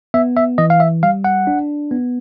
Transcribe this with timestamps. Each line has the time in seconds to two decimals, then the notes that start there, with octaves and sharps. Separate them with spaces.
0.14 B3 E5
0.37 E5
0.58 E3 D#5
0.70 F5
0.80 E5
1.03 G3 F5
1.24 F#5
1.47 D4
1.91 B3